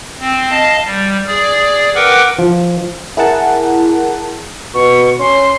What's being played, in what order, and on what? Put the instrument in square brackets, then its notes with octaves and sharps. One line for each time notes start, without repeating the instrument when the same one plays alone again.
[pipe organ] C4
D#5 F5 A5
G3
G#4 D5
A#4 B4 F#5 G5 D6
[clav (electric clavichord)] F3
[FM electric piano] E4 G#4 A#4 F#5 A5
[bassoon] B2 [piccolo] C#6
[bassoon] C#4 [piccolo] C6